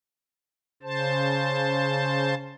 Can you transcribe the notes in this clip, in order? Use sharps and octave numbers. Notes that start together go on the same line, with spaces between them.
C#3 C5 A5